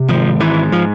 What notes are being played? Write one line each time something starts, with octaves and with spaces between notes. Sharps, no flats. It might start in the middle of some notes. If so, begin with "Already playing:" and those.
Already playing: C3
G#1 F3
G#2 E3
F3